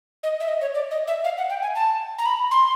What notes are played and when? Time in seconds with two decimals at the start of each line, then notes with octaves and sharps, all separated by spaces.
0.23 D#5
0.40 E5
0.48 D#5
0.61 C#5
0.74 D5
0.91 D#5
1.07 E5
1.24 F5
1.38 F#5
1.50 G5
1.62 G#5
1.75 A5
2.19 A#5
2.26 B5
2.51 C6